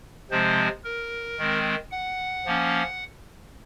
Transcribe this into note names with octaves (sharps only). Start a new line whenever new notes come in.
C3 F3 G#3 C4 C5
A#4
D#3 G#3 C4
F#5
F3 A#3 C#4